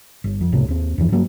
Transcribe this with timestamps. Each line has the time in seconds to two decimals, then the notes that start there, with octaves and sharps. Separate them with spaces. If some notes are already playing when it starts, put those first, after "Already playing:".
0.24 G1
0.41 F2
0.52 F1 C#2 A2 C3
0.68 D#2 C4
0.98 E2 G2 E3 F3
1.12 G2 F#3 A#3